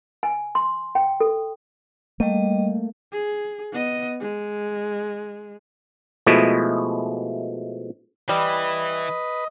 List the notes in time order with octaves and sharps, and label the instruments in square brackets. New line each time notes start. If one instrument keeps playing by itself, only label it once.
[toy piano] G#5
C6
G5
A4
[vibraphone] G3 D#5 [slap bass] A3 A#3
[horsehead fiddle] G#4
B3 D#5
G#3
[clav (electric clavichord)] B2 F3 G#3 A3 E4
[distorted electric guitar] E3 [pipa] G3 [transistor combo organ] B4 [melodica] D#5